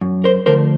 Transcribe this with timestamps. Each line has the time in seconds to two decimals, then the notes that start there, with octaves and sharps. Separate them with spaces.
0.01 F#2
0.24 A#4 C5
0.46 D3 F3 A3 A#4 C5